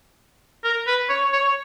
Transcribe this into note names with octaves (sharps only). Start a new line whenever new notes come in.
A#4
B4
C#5
C#5